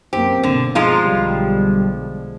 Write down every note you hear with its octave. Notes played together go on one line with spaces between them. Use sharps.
F#2 A#3 C4 G4
G1 B2 D3
F3 G#3 F4 A#5
B1 D3 G3